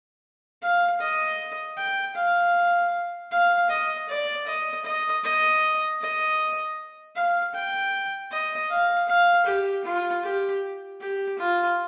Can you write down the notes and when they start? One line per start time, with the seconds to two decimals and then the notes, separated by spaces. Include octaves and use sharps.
0.62 F5
1.00 D#5
1.77 G5
2.16 F5
3.31 F5
3.70 D#5
4.08 D5
4.46 D#5
4.85 D#5
5.24 D#5
6.01 D#5
7.15 F5
7.54 G5
8.31 D#5
8.70 F5
9.08 F5
9.46 G4
9.84 F4
10.23 G4
11.01 G4
11.39 F4